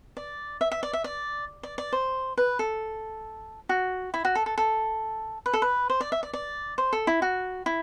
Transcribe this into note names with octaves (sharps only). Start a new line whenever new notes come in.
D5
E5
E5
D5
E5
D5
D5
D5
C5
B4
A4
F#4
E4
F#4
A4
A4
A4
B4
A4
B4
C5
D5
E5
D5
D5
C5
A4
E4
F#4
E4